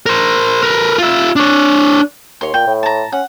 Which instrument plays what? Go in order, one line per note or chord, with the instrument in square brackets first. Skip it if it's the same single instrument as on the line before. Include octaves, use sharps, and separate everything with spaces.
[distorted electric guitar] A#4 C5
A#4 B4
F4 E5
D4 C#5
[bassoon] D#2 [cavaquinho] C#5 C6
[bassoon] A#2 [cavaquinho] G5
[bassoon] A2
[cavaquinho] A5 A#5
[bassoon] C#4 [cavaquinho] F#5